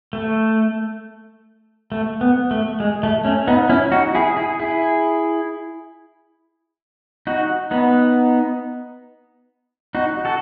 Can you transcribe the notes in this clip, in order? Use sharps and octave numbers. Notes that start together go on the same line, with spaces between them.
A3
A3
B3
A3
G#3
A3
A3 C#4
B3 D#4
C#4 E4
D#4 F#4
E4 G#4
E4 G#4
E4 G#4
D#4 F#4
B3 D#4
D#4 F#4
F#4 A4